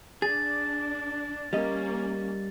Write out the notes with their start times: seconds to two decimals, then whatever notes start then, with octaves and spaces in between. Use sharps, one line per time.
0.22 D4 G#4 A6
1.53 G3 A#3 C#4 D#5